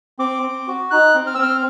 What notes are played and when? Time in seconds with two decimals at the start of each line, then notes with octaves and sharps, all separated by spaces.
0.19 C4 D6
0.43 C4
0.68 F#4
0.91 D#4 F#6
1.15 C4
1.27 F6
1.35 E6
1.38 C4 F6